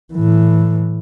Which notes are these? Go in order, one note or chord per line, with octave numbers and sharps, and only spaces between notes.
A2 E3